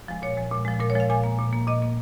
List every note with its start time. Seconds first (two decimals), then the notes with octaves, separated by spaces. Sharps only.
0.08 F3 G#3
0.22 A#2 C#5
0.37 F3 G#3
0.52 A#2
0.65 F3 G#3
0.80 A#2 A#4
0.90 C#5
0.95 F3 G#3 F5
1.09 A#2 G#5
1.24 A#3
1.39 A#2
1.53 A#3
1.67 A#2 D#5
1.82 A#3